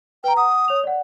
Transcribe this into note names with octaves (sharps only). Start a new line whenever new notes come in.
B4 G5 A#5
F#5 D#6
C#5 F7
D5 F#5